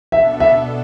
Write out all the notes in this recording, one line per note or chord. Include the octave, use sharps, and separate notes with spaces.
B2 B3 D4 A4 E5
E5